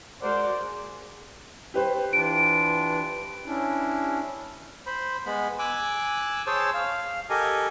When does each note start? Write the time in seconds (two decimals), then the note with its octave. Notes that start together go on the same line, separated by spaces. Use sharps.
0.22 G#3 F#4 A#4 C5 D5 F#5
0.59 G#4
1.74 G4 B4 C5
2.13 E3 D4 F4 D7
3.46 C#4 D4 E4
4.86 C5 B5
5.26 G#3 B3 B5
5.59 G#5 D6 E6 F#6
6.47 G#4 C5 C#5 A5 E6
6.74 F5
7.30 G4 A4 A#4 D#5 G#5